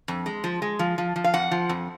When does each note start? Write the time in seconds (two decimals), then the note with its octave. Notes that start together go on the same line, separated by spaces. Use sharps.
0.08 F2
0.26 G#3
0.44 F3
0.62 G#3
0.79 F3
0.98 F3
1.16 F3
1.24 F5
1.34 F2 F#5
1.51 F3
1.69 F2